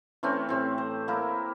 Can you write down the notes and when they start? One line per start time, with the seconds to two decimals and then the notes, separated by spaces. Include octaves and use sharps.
0.23 E3 A3 C4 C#4
0.49 A2 C4 G4
0.78 C5
1.08 A#3 E4 A#4